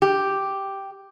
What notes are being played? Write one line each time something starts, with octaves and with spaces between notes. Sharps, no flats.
G4